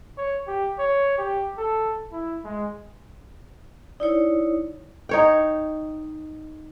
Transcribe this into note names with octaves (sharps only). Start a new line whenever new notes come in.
C#5
G4
C#5
G4
A4
E4
G#3
D#4 E4 C#5 D5
D#4 C#5 G5